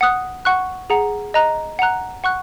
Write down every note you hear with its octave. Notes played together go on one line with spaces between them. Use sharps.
F#5 D#6 F#6
F#5 C#6 F#6
G#4 F#5 A#5
D#5 A#5 F#6
F#5 A#5 F#6
F#5 C#6 F#6